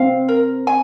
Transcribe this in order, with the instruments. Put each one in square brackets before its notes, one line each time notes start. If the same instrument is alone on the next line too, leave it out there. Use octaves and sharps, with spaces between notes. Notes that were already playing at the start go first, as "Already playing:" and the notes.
Already playing: [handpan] C4 [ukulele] F5
[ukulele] A#4
G#5